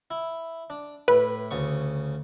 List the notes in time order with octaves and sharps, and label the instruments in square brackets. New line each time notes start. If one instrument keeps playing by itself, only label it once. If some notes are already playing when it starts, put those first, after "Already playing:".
[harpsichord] E4
D4
[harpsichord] A2 B5 [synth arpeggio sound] B4
[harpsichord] D2 C#3 C#6